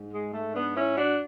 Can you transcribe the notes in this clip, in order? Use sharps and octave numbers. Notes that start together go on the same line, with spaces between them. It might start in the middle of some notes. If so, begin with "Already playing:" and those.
Already playing: G#2
G#3
A3
B3 D4
C#4 E4
D4 F#4